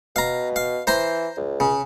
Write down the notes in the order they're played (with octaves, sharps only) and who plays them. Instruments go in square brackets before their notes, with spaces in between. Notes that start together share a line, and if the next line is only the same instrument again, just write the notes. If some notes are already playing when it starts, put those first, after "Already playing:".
[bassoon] B2 [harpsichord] F5 A#5
[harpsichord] F5
[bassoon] E3 [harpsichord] C5 A#5 C6
[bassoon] C#2
[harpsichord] C#3